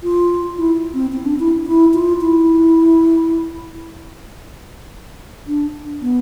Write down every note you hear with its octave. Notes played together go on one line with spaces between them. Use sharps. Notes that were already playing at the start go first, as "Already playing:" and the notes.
F4
E4
C4
C4
D4
E4
E4
F4
E4
D4
B3